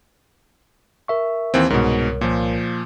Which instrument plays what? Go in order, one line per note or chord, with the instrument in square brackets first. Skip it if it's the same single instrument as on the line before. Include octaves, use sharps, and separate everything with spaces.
[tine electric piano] A#4 E5 C#6
[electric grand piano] D#2 E3 C4
[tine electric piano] C2 A#4 C#5 [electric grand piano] G#2 B2
[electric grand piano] A#2 F3